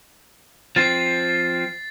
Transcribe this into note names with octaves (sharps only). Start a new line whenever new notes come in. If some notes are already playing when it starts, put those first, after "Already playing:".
F3 C4 A6 C7